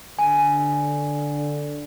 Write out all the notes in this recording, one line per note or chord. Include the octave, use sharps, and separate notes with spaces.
D3 G#5